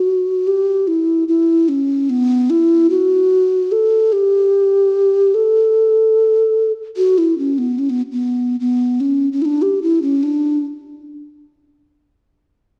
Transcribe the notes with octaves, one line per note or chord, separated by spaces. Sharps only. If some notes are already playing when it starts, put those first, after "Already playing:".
Already playing: F#4
G4
E4
E4
C#4
B3
E4
F#4
A4
G4
A4
F#4
E4
C#4
B3
C#4
B3
B3
B3
C#4
C#4
E4
D4
G4
E4
C#4
D4